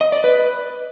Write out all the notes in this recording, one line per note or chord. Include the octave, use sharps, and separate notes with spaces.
D#5
D5
B4